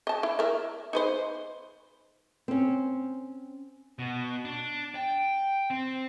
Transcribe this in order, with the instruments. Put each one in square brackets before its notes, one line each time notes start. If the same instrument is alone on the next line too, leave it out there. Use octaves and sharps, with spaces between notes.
[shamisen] D#5 A5
E4
A#4 E5
D#4 B4 C5
[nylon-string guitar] C4 C#4
[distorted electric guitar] B2
D4
G5
C4